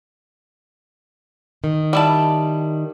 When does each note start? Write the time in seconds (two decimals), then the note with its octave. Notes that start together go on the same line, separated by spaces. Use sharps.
1.64 D#3
1.93 G3 E4 A5